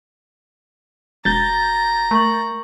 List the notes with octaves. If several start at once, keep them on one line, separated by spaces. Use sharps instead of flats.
E1 F#4 A#5 G6 A6
A3 A#4 C#6 F#7